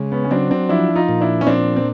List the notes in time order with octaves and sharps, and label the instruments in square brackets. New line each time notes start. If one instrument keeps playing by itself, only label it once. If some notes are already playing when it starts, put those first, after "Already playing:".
Already playing: [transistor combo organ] C#3 G#3
[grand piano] B3 C#4
C#4
[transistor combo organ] F#3 [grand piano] C4 D4
[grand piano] C4 D4
[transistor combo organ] F3 [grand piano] D4 E4
[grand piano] D#4 F4
[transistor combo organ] A#2
[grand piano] D4 E4
C#4
[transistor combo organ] F3 [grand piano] C4 D4
[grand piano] C4